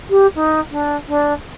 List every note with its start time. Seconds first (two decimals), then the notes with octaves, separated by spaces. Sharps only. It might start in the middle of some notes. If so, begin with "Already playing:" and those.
0.10 G4
0.35 D#4
0.71 D4
1.07 D4